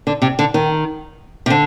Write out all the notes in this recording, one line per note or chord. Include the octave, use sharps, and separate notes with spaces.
D3
C3
D3
D#3
C3
D3